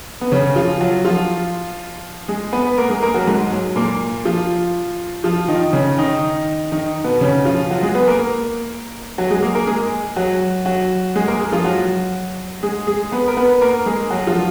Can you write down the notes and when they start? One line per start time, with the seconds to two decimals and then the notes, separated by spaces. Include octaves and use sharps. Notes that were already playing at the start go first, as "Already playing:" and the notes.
0.21 B3
0.32 C#3 C#4
0.56 F3 F4
0.81 F#3 F#4
1.05 F3 F4
2.28 G#3 G#4
2.53 B3 B4
2.78 A#3 A#4
2.90 G#3 G#4
3.02 A#3 A#4
3.14 F#3 F#4
3.27 G#2 G#3
3.52 F#3
3.76 A#2 A#3
4.25 F3 F4
5.24 F3 F4
5.48 D#3 D#4
5.73 C#3 C#4
5.98 D#3 D#4
6.72 D#3 D#4
7.04 B2 B3
7.21 C#3 C#4
7.45 F3 F4
7.70 F#3 F#4
7.83 G#3 G#4
7.95 B3 B4
8.07 A#3 A#4
9.18 F#3 F#4
9.31 G#3 G#4
9.42 A#3 A#4
9.55 A#3 A#4
9.67 G#3 G#4
10.16 F#3 F#4
10.66 F#3 F#4
11.16 G#3 G#4
11.27 A#3 A#4
11.40 G#3 G#4
11.52 F3 F4
11.65 F#3 F#4
12.63 G#3 G#4
12.87 G#3 G#4
13.12 B3 B4
13.28 A#4
13.37 B3 B4
13.61 A#3 A#4
13.86 G#3 G#4
14.10 F#3 F#4
14.27 F3 F4